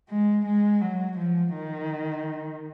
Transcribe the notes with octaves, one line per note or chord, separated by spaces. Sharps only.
G#3
G#3
F#3
F3
D#3